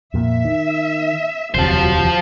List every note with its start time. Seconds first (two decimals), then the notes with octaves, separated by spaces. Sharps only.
0.14 F2 A#2 E5
0.45 D#3
1.55 E1 D2 C3 F3 F#3 C5